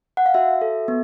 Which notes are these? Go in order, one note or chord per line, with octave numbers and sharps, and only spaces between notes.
F#5
F5
F#4 E5
A4
B3